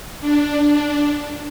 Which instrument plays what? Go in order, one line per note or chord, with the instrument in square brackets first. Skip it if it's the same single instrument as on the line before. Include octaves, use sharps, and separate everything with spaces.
[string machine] D4